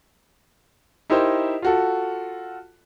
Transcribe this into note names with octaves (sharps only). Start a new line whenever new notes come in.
D#4 E4 G4 A#4 C5
F4 F#4 A4